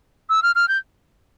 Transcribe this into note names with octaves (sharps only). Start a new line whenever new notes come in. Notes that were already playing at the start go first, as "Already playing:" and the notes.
E6
F6
F6
G6